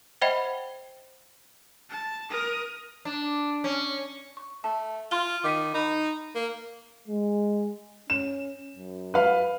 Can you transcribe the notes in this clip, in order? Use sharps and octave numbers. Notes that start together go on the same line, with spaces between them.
C5 D#5 E5 F#5 G5 B5
A5
A#4 D#6
D4
C#4
C#6
A3 A5
F4 C6 F6 G7
D#3 D6 B6 D#7
D#4 B5
A#3
G#3
C#4 E7
F#2
B4 F5